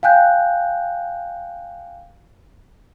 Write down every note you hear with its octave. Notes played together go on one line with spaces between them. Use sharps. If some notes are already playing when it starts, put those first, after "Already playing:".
F5 G5 G#5 F#6 G6